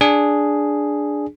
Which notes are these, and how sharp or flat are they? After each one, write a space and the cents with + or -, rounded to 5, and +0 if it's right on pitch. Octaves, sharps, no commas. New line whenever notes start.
D4 +0 G#4 +0